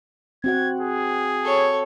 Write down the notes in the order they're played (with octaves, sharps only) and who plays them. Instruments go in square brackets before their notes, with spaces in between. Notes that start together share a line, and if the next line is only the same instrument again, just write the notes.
[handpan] C4 F#4 F#5 [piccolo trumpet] G#6
[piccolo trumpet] G#4
[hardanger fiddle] A4 C#5